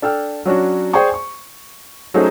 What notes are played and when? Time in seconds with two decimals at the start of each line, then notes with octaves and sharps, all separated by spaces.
0.02 D4 A4 G5 F6
0.45 F#3 C#4 D4 F#4
0.93 G#4 C5 D5 G5 G#5 C#6
1.14 C#6
2.14 F#3 A3 C#4 D#4 G#4 C5